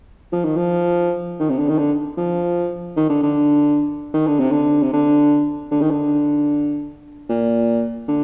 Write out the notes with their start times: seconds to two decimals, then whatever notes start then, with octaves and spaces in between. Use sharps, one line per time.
0.33 F3
0.45 D#3
0.57 F3
1.40 D#3
1.50 C3
1.59 D3
1.69 D#3
1.78 D3
2.17 F3
2.96 D#3
3.10 D3
3.23 D3
4.14 D#3
4.27 D3
4.40 C3
4.52 D3
4.83 C3
4.93 D3
5.71 D3
5.81 D#3
5.91 D3
7.29 A#2
8.08 D3